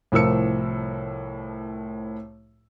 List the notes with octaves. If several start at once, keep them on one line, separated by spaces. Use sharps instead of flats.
C2 A2 F3 A#4 E6 C#7